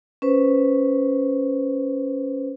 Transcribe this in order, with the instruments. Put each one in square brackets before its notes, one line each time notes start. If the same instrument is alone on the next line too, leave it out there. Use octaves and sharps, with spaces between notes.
[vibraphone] C#4 B4 C5